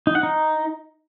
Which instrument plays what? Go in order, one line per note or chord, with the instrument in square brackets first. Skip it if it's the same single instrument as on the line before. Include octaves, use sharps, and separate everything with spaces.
[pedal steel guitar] D#4
F#5
D#4